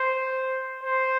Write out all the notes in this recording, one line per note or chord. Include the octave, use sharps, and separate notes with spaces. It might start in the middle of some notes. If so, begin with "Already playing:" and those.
Already playing: C5
C5